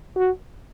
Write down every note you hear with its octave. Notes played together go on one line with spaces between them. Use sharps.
F#4